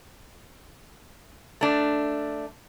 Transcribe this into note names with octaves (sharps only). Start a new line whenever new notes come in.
A3 D4